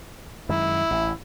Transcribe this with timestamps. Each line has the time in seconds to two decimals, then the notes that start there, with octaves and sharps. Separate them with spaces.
0.49 F#2 D#3 G#3 E4
0.91 A1